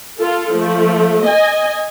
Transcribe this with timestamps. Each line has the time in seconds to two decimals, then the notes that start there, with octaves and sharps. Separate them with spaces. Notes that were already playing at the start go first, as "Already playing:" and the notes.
0.18 F4 A4
0.54 F3 A3
1.23 D#5 G#5